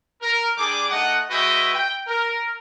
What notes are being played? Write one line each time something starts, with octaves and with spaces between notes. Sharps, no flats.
A#4
G3 D4 G#4 D6
A3 D#4 D#5 F#5
G#3 F#4 B4 D#5 E5 G5
G5
A#4